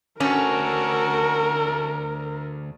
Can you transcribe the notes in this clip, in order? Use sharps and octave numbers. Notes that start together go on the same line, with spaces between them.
D2 A3 C#4 F#4 A4 A#4